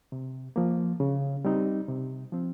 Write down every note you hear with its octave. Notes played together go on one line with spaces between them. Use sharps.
C3
F3 A#3
C#3
G3 C4 D#4
C3
F3 C4